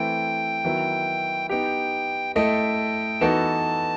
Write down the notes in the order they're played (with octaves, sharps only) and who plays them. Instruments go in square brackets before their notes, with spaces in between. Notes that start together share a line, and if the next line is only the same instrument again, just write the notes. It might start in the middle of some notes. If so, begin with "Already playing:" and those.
Already playing: [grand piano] E3 A3 C4 E4 [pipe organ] G5
[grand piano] D#3 F#3 B3 E4
[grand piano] B3 D#4 G4 [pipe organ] G5
[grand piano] A3 E4 A4 D#5 [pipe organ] G5
[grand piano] E3 B3 D#4 F#4 A4 [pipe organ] A5